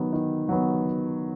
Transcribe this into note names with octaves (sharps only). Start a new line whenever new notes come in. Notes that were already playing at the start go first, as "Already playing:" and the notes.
Already playing: D#3 F#3 B3
D#3
F#3 B3